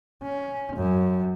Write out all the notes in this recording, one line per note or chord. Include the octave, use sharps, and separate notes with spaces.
C#4
F#2